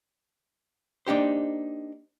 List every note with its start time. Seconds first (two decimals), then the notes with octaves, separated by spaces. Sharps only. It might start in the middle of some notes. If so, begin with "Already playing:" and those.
1.07 A#3 D4 D#4 G4 C5